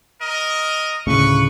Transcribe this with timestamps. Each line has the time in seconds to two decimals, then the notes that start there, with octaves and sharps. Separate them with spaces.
0.21 A#4 D#5
1.07 D2 A2 C#3 B4 C#6